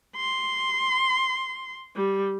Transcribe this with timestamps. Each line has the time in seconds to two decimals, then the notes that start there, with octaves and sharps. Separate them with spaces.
0.16 C6
1.96 G3